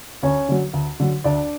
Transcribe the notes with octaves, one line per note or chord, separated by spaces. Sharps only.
D2 C#4 C#5
D3 F#3
D2
D3 F#3
D2 D4 D5